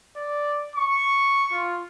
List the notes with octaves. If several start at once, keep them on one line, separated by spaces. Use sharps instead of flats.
D5
C#6
F4